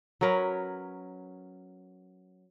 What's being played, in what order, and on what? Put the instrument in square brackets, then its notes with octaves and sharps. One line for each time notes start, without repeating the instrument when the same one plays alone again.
[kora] F#3 C#4 A#4 B4